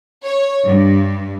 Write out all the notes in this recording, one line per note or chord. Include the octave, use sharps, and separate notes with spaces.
C#5
G2